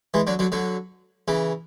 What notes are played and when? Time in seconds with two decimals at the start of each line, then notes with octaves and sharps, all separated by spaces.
0.14 E3 G#3
0.27 D3 F#3
0.39 D3 F#3
0.52 D3 F#3
1.28 C#3 E3